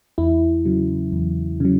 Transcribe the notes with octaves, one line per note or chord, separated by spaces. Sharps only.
E2 E4
C#3 F#3
E2
C#3 F#3